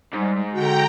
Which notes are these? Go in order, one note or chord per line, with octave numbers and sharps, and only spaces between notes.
G#2 G3
D3 F#4 G5 A#5